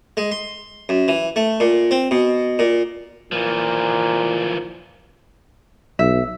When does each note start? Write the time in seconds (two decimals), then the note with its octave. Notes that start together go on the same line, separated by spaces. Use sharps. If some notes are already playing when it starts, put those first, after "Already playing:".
0.17 G#3
0.32 C6
0.89 F#2
1.08 E3
1.36 A3
1.60 A#2
1.91 C4
2.11 B2
2.59 A#2
3.32 A#2 E3 F3
5.99 B1 E5